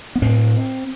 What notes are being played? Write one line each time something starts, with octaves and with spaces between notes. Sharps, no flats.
B3
A2 C4